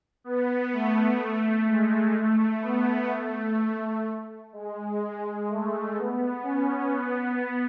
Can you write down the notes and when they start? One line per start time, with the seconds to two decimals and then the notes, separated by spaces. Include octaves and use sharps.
0.24 B3
0.73 A3
1.67 G#3
2.15 A3
2.62 B3
3.11 A3
4.53 G#3
5.48 A3
5.96 B3
6.43 C#4
6.92 B3